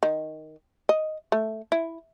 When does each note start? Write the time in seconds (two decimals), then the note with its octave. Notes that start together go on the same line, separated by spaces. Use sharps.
0.03 D#3
0.89 D#5
1.32 A3
1.72 E4